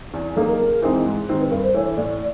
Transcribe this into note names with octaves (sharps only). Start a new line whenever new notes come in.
E2
C#3 F#3 A#3 D#4 A4
A#4
C#3
E3 G#3 C4 D#4
G#2
D#3 G#3 C4
B4
G2 A#4
C5
E3 A3 C#5
A2 D5